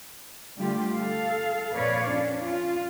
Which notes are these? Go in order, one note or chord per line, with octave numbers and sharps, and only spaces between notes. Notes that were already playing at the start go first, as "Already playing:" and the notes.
D3 G3 A3 F4 G4
A4 F5
F2 A#2 B4 C#5 D5 F5
C#4 D4
F4